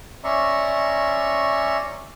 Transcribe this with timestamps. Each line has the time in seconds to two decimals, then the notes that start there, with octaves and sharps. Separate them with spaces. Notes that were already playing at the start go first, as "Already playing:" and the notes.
0.24 C#4 D5 E5 A#5 C6 C#6